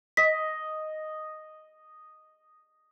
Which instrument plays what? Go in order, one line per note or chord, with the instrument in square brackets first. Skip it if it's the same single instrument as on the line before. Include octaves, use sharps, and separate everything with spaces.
[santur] D#5 [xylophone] B6